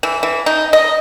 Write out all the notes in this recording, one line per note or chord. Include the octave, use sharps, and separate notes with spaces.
E3
E3
D#4
D#5